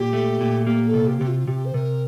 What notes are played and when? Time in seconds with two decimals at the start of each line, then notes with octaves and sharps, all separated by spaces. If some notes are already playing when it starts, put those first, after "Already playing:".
Already playing: A#2 G4
0.13 A3
0.41 A#2
0.66 A#3 G4
0.87 A4
0.94 C3
1.07 G4
1.18 C3 G4
1.28 F4
1.39 F4
1.47 C3 G4
1.66 C5
1.74 C3 A#4